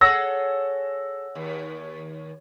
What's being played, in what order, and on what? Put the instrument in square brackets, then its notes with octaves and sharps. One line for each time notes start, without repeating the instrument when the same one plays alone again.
[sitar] G#4 A4 C#5 [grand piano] F#5 E6 A#6
[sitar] D#2